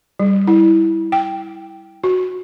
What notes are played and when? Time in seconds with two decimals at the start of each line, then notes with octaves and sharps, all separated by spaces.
0.20 G3
0.48 E4
1.12 G5
2.04 F#4